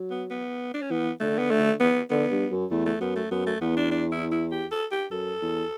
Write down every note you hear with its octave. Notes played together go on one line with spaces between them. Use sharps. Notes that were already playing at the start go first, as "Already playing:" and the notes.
Already playing: F#3
B3
B3
D4
C#4
E3 B3
D3 A3
B3
A3
B3
D3 B3
G2
F#2
E2 A3
A3
F#2 B3
A3
F#2 B3
A3
E2 B3
D4
D4
E4
E4
G4
A4
G4
F#2 A4
E2